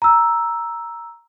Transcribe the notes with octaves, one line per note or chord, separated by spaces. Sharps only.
A#5 E6